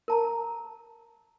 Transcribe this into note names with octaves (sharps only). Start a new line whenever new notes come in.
A#4 A5 A#5